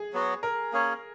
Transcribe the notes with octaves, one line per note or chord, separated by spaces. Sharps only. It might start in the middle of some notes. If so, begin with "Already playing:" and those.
Already playing: G#4
F#3 B3 F#4
A#4
A#3 C#4 G#4 C#5